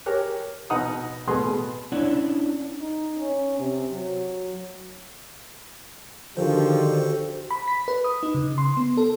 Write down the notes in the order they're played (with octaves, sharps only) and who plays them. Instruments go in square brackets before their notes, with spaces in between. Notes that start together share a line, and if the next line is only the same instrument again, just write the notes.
[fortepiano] G4 A#4 C#5 F#6
B2 D#4 F#5 A#5 D#6
B2 A3 B3 G#4 G#5 C6
[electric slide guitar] C#4 D4 E4 D5 F#5
[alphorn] D#4
C#4
C3
F#3
[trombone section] D3 G4 [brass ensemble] D#3 F3 [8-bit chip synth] F#4 A4 C5
[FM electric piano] B5
B6
B4
D#6
D#4
C#3
C6
B3
A4